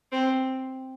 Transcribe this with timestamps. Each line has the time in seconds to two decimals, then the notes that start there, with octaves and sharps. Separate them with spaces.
0.12 C4